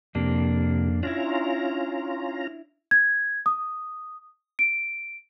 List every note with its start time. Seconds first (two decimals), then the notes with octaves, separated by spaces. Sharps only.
0.15 F2 C3 A#3 D4
1.03 C#4 D4 E4 F4 A#5
2.91 G#6
3.46 D#6
4.59 D7